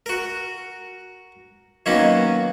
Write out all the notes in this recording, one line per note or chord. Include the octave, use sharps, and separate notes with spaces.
F#4 A#4
D#3 F#3 A#3 B3 C#4 D#4